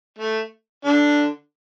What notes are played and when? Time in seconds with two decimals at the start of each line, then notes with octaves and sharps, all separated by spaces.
0.19 A3
0.85 D3 D4